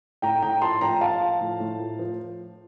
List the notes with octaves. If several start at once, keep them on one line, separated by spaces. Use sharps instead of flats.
A2 G5 A#5
A2 G5 A#5
F3 A5 C6
F3 G5 A#5
F3 F5 A5
F3
A2
A2
F3
F3